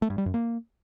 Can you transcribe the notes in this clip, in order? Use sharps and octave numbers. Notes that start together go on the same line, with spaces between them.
A3
G2
G3
F#2
A#3